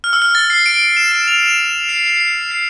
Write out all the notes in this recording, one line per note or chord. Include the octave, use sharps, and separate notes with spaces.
F6
E6
F6
A6
C7
D7
E7
E7
F7
E7
C7
C7
C7
C7
C7